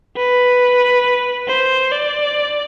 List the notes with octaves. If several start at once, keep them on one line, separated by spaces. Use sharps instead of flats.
B4
C5
D5